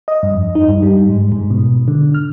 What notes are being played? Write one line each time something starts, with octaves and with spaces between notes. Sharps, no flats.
D#5
G2
F2
D#4
G2
G3
G#2
G#2
B2
D3
F6